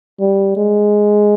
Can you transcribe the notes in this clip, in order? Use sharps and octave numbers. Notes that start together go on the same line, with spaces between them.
G3
G#3